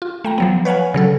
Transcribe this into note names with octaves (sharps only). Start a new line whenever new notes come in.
F4
A3 G5 A#5
F3 F#3 B3
B4 C#5 F5 F#5 G#5
C#3 F#3 A4